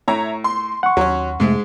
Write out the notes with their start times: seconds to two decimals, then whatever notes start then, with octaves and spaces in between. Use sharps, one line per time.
0.08 A2 C#5 E5 A#5
0.44 C6
0.83 F#5 C#6
0.97 D#2 F#3 C#4
1.40 F2 G#2 C3 G#3 A3